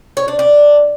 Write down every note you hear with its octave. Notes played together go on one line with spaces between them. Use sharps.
C#5
D4
D4